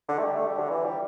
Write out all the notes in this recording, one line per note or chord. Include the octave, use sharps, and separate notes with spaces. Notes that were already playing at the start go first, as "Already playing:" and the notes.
D3
A3
G3
A3
G3
D3
E3
G3